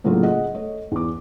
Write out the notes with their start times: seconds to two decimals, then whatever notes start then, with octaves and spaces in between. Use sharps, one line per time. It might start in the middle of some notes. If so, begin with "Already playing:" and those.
0.04 A2 C#3 F#3 A#3 D4 F4
0.23 G#4 D#5 F#5
0.54 A3 C#5 D#5
0.92 E2 D6